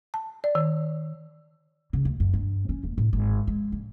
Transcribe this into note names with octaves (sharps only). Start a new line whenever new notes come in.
A5
D5
D#3
C#3
D2
F#2
G2
C#4
D#1
A2
G#1
G#3
A1